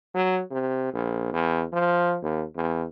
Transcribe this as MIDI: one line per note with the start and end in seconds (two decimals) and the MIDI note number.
0.15 0.41 54
0.51 0.92 48
0.93 1.29 34
1.32 1.64 40
1.73 2.17 53
2.22 2.44 39
2.55 2.85 40